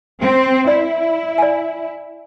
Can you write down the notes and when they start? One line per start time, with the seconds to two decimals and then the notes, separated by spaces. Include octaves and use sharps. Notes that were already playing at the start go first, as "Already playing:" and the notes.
0.22 C4 C5
0.68 E4 D5
1.38 D5 G#5